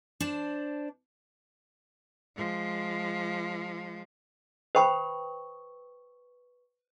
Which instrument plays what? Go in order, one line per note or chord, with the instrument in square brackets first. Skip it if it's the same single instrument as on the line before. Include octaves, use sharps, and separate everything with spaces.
[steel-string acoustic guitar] D4 C5 D5 A5
[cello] F3 G#3
[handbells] B4 C#6 [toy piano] C5 G5 B5